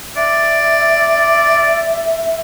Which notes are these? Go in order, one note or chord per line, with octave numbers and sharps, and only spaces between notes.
D5 E5